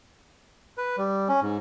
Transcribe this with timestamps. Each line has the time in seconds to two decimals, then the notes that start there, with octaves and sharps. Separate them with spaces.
0.78 B4
0.97 G3
1.29 C#4
1.42 G#2